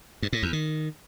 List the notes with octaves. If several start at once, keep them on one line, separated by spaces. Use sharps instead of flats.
G2
A2
E2
D#3